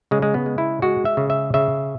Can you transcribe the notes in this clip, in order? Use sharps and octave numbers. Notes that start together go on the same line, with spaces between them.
C#3 G#3
G#3
B3
G#3
E4
G#3 F#4
E5
C#3
E5
C#3 E5